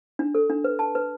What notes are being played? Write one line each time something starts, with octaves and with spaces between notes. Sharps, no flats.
D4
A4
D4
B4
A5
B4